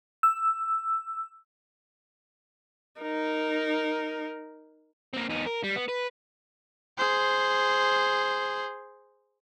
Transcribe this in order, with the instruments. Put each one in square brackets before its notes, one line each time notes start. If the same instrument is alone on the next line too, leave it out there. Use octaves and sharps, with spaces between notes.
[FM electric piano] E6
[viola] D#4 A#4
[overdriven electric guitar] A#3 C4
E2 D#4
A#4
G3
B3
B4
[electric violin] G#4 C5